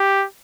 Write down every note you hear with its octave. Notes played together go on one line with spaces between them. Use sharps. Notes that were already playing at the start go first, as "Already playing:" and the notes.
Already playing: G4